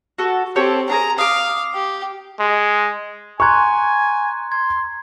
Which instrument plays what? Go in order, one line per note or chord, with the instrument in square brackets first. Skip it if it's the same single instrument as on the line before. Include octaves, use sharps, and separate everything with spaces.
[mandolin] F#4 A4
[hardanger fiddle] C4 [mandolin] G4 A4 C#5
[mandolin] D4 G#4 A#4 [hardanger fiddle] A#5
[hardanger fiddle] F5 [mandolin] D6 D#6
[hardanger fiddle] G4
[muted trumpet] G#3
[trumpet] G#5 [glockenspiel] A#5 C6 G#6 [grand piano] C#6 F#6
[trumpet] C6 [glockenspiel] G#6